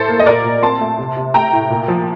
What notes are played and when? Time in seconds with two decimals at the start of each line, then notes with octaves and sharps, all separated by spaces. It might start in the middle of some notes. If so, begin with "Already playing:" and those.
Already playing: A2 A4 C5
0.09 A#3
0.19 D#5
0.26 A#2 A#4 D5
0.44 A#2
0.62 C4 A5 C6
0.81 A3
0.98 C3
1.16 C3
1.34 A3 G5 A#5
1.53 A2
1.70 A#2
1.88 F3